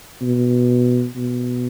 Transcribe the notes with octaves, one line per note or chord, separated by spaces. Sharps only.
B2
B2